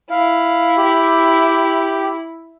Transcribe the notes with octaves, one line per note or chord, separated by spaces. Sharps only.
E4 F5
G4